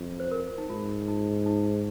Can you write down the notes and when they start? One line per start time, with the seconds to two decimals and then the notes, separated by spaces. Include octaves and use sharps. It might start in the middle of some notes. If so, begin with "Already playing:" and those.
Already playing: F2
0.20 C5
0.31 A#4
0.58 D#4
0.69 G#2 F4
1.08 D#4
1.46 D#4